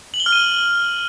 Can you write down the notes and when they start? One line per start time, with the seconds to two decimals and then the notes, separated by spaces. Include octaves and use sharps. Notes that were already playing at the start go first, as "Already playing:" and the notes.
0.14 F#7
0.20 G7
0.26 F6
0.32 D#7